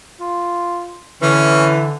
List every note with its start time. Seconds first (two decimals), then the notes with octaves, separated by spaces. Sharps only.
0.21 F4
1.22 D3 E3 C#4